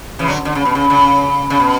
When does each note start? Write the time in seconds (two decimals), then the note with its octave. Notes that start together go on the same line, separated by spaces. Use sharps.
0.19 C#3 E3
0.28 D3 F#3
0.45 D3
0.55 C#3
0.65 B2
0.75 C#3
0.90 C#3
1.50 C#3
1.60 B2